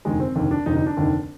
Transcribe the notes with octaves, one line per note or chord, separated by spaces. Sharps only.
F1 D#2 D3 G#3
C4
F1 D#2 D3
D4
F1 D#2 D3 D#4
D#4
D4
F1 D#2 D3